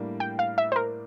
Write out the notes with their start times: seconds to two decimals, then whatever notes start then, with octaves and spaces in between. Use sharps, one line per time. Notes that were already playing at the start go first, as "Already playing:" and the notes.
Already playing: A2 G3 A#3 D4
0.20 G5
0.39 F5
0.58 E5
0.72 C5
0.76 A#4